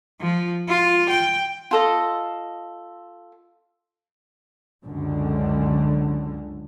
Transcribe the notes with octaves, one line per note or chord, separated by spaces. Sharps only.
F3
F4
G5
F4 A4 D#5
C#2 F#2 D3